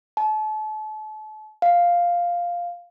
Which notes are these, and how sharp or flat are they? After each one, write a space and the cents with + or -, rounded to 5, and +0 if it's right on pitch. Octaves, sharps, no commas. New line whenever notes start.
A5 -35
F5 +0